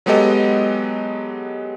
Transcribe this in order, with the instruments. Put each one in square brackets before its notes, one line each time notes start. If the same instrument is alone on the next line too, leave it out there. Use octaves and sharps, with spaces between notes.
[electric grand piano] F#3 G#3 B3 G4 A4 D#5